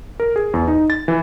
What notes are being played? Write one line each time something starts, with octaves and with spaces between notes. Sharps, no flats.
A#4
G#4
E2
D#4
A6
E3